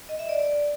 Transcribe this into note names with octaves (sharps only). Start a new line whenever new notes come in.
D#5
E5
D5
D5